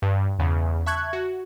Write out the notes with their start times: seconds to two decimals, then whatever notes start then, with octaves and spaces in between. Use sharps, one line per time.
0.02 G2
0.39 E2 C#3
0.86 E5 A5 C#6 F#6 G#6
1.13 F#4